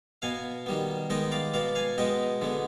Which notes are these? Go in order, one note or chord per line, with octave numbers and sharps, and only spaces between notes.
B2 B3 F5 G#5
D#3 G3 B3
D#3 G#3 B3 D#5 G5
D5 F5
B2 B3 D5 F5
F5 G#5
B2 G#3 B3 D#5 G5
D3 G#3 B3